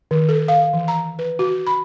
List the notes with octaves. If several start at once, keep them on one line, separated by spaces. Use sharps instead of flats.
D#3
A4
F5
E3
A#5
B4
F#4
B5